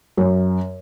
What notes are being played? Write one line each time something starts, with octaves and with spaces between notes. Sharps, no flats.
F#2